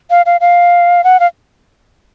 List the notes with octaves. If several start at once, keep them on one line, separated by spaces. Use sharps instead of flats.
F5
F5
F5
F#5
F5